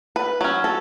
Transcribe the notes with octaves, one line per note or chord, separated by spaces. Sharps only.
B4
F#3 C#4
A4